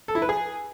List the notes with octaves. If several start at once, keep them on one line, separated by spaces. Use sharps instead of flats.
A4
E4
B4
G#4